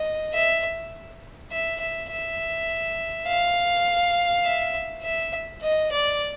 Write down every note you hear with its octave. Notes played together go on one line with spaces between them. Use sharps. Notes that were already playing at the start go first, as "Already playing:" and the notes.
Already playing: D#5
E5
E5
E5
E5
F5
E5
E5
D#5
D5